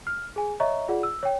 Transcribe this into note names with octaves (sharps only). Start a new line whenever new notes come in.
F6
G#4 G#5
C#5 D#5 E5 A#5 C#6
F4 G#4 D5 F#5
E6
C#5 G5